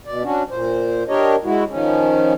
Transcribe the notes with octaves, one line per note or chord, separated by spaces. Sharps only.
B2 D5
C#4 D4 F#4
A#2 C5
D4 G4 A#4 C#5 D#5
G#3 E4 F#4
D#3 F3 C#4